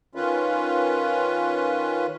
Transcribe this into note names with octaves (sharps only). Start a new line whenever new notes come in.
D#3 C#4 F4 B4